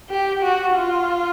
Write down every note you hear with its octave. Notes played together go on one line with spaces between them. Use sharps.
G4
F#4
F4